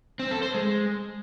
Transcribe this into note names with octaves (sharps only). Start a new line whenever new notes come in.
C4
A4
C5
G#3